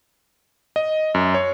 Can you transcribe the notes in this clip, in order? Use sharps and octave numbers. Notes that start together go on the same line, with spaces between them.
D#5
F#2
C#5